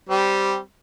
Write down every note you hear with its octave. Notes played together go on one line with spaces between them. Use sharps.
G3 C4